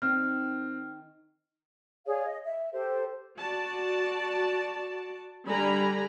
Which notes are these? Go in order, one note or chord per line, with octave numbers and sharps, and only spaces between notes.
D#3 C4 F6
G#4 C#5 D5 F5
D#5
E5
G4 A4 C5
F#4 D5 A5
D3 G3 G#5 A#5 B5